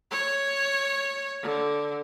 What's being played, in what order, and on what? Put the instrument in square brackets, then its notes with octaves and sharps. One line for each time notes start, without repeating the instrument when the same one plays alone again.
[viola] C#5
D3